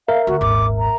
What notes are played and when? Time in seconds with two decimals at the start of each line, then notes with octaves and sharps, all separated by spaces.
0.08 A#4 E5 F5
0.27 D2 F#4
0.41 D#1 G#1 D6
0.79 A#5